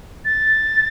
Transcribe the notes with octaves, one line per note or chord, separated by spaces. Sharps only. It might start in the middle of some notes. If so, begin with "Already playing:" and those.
A6